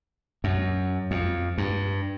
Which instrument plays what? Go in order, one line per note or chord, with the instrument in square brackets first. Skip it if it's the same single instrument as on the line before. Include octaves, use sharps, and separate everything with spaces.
[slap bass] F#2
F2
G2